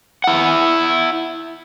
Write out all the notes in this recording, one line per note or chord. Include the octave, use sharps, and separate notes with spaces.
E4 F#5